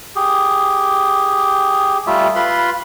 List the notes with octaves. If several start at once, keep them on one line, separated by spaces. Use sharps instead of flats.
G4 G#4
G3 A3 F4 E5
F4 B4 B5 C6